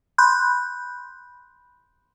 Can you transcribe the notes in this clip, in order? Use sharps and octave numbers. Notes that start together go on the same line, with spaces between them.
B5 C6 F#6 G6